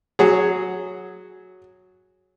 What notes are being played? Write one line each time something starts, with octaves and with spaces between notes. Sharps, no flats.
F#3 G#4